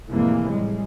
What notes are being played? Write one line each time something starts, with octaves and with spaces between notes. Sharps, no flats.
F1 A2 C3 E3 G#3 A#3
A2 G3 G#3